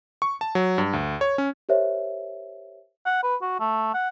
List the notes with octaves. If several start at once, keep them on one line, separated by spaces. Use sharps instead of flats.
C#6
A5
F#3
G2
D2
C#5
C#4
G4 A#4 C5 C#5 E5
F#5
B4
F#4
A3
F#5